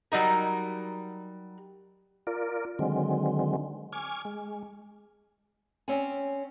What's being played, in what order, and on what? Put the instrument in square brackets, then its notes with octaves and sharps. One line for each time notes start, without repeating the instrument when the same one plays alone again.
[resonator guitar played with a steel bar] F#3 G3 D#4 A#4
[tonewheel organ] F4 A#4 D5
D3 D#3 F#3 G#3 C4
G#5 C#6 D6 F6
G#3
[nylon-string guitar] C4 C#4 C#5 D5 G#5